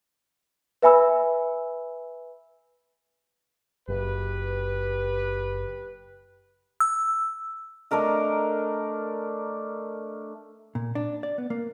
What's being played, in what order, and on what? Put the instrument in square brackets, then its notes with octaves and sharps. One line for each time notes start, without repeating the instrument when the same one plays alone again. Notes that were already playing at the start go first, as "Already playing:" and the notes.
[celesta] B4 E5 G#5 B5 E6
[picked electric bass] F#1 [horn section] G4 B4
[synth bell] E6
[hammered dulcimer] A3 D4 A#4 D#5
[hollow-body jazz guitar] A#2
D4
D5
B3
A#3